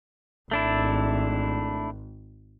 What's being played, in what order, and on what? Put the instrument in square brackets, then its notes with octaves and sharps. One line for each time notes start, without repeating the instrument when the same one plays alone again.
[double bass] G#1 [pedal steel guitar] A3 D4 E4